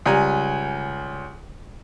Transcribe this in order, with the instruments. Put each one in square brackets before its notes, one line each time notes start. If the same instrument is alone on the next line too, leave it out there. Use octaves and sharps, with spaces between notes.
[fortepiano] C#2 G3 G#5 A#5